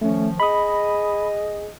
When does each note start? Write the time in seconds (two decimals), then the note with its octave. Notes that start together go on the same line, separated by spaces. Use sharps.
0.01 D#3 F3 A3 C#4
0.40 G#4 D#5 B5 D#6